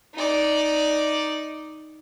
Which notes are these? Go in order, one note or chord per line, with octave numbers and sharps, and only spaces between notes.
D#4 D5